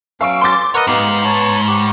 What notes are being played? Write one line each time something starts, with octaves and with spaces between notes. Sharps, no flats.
F#3 C#4 F5 C#6 E6 D7
C6 D6 A6
A#4 B4 C#5 D#5 F#5
G#2 B3 D#4 G4 F5
C#5 A5
G4 C#6